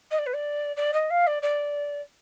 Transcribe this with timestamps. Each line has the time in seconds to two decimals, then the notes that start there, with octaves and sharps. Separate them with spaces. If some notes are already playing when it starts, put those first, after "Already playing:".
0.11 D#5
0.18 D5
0.26 B4
0.33 D5
0.77 D5
0.93 D#5
1.10 F5
1.27 D5
1.42 D5